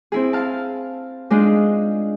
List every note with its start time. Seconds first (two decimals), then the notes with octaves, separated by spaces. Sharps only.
0.12 C4 E4 G#4
0.33 F5 A5
1.30 G#3 D4 D#4 F4 G#4